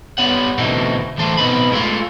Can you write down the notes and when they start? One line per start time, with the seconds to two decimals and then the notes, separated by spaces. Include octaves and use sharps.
0.18 G3 B3 C#5 F#5
0.58 D2 B2 E3 A3 C4 D#4
1.18 E3 A3 A4 C5
1.38 B2 B3 C4 D#4 B4 B5
1.72 G#3 A3 F4